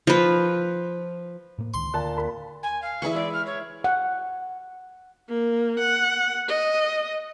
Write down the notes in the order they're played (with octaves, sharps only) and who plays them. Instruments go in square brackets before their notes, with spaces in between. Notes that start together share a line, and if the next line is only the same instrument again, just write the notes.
[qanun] F3 B4
[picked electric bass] A2 A#3
[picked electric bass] C#2 D#3 [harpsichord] C6
[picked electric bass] D2 [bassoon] A#2 [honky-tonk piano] A5 F#6
[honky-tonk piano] A#3 B5
[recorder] G#5
F5
[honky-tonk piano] E3 G#4 E5 [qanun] E4 B4 C#6
[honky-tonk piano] G#3 E5 [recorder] D5
[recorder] F6
C#5
[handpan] F#5
[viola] A#3
F#5
D#5